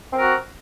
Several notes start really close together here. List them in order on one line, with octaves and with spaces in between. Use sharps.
C4 A#4 F#4